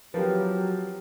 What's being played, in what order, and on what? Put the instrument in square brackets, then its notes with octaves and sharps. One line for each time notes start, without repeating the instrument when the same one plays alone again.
[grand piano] F3 C4 [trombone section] F#3 [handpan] G4 A#4 B4